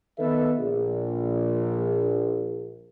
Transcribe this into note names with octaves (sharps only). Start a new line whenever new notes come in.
D#3 B3 A4 B4 D#5 E5
A#1